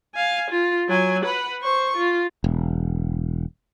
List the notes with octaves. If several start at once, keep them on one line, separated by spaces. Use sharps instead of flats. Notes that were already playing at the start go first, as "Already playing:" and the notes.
F5 G#5
F4
F#3 G#5
B4 F#5
C5 C#6
F4
E1